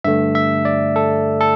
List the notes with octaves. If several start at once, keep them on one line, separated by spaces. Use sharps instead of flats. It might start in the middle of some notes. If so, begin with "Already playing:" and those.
G2 D3 A3 E5
E5
D5
A4
A4